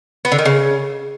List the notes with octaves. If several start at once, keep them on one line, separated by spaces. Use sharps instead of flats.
B3
D3
D#3
C#3